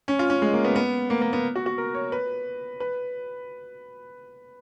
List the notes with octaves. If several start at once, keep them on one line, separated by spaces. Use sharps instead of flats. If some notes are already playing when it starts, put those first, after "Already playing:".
C#4
F4
C#4
G#3
A#3
B3
B3
A#3
A#3
B3
F#4
F#4
A#4
C#5
B4
B4